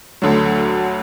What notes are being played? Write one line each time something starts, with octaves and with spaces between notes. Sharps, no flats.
D2 D3 F#3